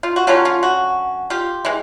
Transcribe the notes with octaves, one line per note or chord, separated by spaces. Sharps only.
F4
F#4
D3 F#3 A#3 C#4 F4 G4
F4
F#4
F4 G4
E3 G#3